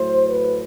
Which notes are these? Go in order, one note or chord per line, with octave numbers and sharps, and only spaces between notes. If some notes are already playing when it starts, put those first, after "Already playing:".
Already playing: A2 F#3 A3 C5
B4